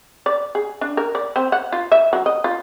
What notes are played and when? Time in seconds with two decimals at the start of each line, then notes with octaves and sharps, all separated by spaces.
0.26 D5
0.55 G#4
0.81 D4
0.97 A#4
1.15 D5
1.36 C4
1.52 F#5
1.72 F4
1.92 E5
2.13 F#3
2.26 D#5
2.44 F4